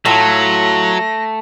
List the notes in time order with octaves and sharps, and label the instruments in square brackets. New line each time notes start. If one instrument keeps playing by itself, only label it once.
[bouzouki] A2 F4 [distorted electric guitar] F#3 [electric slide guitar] A3 [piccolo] A#6